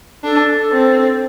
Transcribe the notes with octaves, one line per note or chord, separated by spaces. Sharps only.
D4 A4
C4